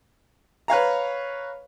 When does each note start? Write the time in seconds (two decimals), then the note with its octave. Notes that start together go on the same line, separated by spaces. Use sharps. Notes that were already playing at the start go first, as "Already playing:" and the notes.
0.68 B4 C#5 F5 A#5